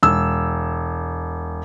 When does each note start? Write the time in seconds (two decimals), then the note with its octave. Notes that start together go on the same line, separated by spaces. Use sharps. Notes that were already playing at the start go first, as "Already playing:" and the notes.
0.03 E1 E6